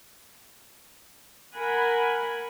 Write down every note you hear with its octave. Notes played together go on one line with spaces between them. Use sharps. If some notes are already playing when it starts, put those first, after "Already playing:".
A#4 F#5 G#5 B5